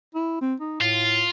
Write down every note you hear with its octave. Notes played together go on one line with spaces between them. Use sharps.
E4
C4
D#4
A2 F4